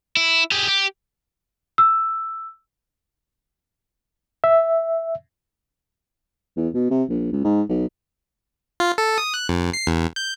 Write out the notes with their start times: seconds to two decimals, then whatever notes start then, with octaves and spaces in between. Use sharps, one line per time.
0.17 E4
0.52 G4 G#4
0.69 G4
1.78 E6
4.44 E5
6.57 E2
6.74 B2
6.91 C3
7.09 A#1
7.33 C#2
7.44 G#2
7.69 B1
8.80 F4
8.98 A4
9.18 D#6
9.34 F#6
9.49 F2
9.74 C7
9.87 E2
10.16 G6